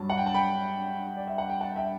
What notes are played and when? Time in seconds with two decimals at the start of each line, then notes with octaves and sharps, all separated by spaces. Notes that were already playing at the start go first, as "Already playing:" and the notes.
Already playing: G2 F#3 A5
0.10 F#5
0.17 G5
0.26 A5
0.34 G5 B5
1.17 D5
1.27 E5
1.38 F#5
1.50 G5
1.61 F#5 A5
1.76 E5 G5